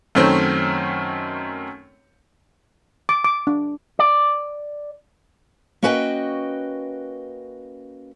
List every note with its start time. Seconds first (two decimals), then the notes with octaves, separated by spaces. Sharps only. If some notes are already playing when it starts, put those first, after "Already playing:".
0.15 F#2 D#3 F#3 A3 C4 C#4
3.09 D6
3.24 D6
3.47 D4
3.99 D5
5.83 A#3 C#4 F#4 B4 D#5 G5